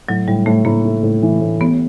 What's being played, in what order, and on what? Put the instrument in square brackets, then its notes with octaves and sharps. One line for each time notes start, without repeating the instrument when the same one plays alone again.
[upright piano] A2 [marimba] F#3
[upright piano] A2 [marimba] G3
[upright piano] A2 [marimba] A3
[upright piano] A2 [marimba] A#3
[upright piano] A3
A2
E3
A2
[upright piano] A1 [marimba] B3